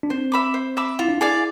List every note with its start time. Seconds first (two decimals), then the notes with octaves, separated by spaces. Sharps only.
0.03 D4
0.10 C4 C5
0.32 E5 B5 D6
0.54 C5
0.77 E5 B5 D6
0.99 E4 F4
1.09 D4
1.18 E4 G#4 D5 F5